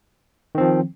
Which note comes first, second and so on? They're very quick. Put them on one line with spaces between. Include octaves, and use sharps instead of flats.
D#3 C4 F3